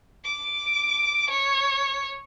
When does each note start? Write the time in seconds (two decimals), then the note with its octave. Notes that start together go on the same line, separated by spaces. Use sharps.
0.24 D6
1.30 C#5